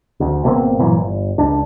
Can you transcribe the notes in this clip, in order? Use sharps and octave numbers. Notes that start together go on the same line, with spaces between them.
D2
G#1 B2 A#3 C4
G2 A#2 E3 F#3
G1
C#2 D4